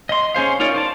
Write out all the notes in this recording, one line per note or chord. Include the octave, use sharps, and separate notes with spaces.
D#5 C6
C#4 G#4 C5 F5
D#4 F4 A#4 C#5 D5
C5 D5 A5